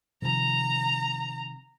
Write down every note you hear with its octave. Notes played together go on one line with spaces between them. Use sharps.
C3 D#3 F3 A#5